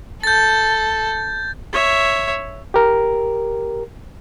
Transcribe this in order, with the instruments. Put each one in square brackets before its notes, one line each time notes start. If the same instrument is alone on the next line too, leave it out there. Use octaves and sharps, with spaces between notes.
[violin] A4 [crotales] G6 A6
[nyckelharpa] C#5 E5
[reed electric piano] G4 A#4